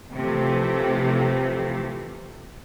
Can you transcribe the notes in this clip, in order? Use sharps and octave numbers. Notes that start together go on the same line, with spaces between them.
C3 E3 F3 A3